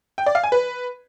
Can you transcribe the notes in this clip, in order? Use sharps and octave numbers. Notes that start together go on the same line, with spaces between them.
G5
D5
F5
G#5
B4